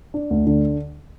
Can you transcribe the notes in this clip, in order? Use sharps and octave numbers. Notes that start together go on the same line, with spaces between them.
D4
D2
D3